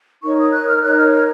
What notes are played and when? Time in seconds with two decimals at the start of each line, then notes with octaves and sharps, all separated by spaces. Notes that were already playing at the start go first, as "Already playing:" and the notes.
0.22 D#4 A#4 C#5 C#6
0.38 D#6
0.52 F#6
0.68 F6
0.82 D#4 A#4 C#5 F#6
0.97 F6
1.12 F6